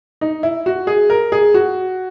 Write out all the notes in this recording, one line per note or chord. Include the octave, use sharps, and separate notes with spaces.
D#4
E4
F#4
G#4
A#4
G#4
F#4